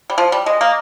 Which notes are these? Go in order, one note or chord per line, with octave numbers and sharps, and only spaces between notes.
G3
F3
G3
G#3 D#5
A#3